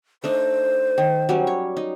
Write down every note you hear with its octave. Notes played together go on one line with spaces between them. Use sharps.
A3 D4 D#4 C5
D#3
F#3 G3 C#4
C#5
D#4